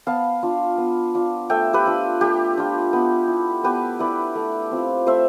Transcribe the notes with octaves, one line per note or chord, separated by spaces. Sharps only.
B3 F5 A5
D4 F4
B3
D4 F4
A3 E5 G5
G4 B4
D4 F4
A3 G4
D4 F4
B3
E4
B3 G4 B4
E4 B4 D5
A3
C4 F4
A3 C5 E5